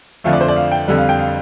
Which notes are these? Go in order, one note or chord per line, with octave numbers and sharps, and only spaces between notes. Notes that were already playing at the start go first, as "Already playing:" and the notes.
F2 D3 F3 A3 F5
D5
C5
D5
F5
G5
F2 D3 G3
F5
G5
F5